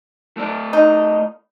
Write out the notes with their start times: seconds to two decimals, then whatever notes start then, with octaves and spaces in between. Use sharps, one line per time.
0.37 A3 E4 D5
0.73 D#4